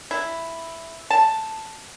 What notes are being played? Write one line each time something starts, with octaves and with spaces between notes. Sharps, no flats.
E4
A5